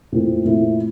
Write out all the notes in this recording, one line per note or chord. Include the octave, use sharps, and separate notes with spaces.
A#2 A3 C4 E4
A#2 A3 C4 E4